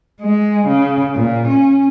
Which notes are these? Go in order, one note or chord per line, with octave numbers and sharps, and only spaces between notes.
G#3
C#3
A#2
C#4